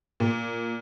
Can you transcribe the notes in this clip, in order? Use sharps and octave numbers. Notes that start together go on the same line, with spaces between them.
A#2